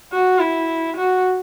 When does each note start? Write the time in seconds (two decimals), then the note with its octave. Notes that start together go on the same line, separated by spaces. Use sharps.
0.13 F#4
0.39 E4
0.96 F#4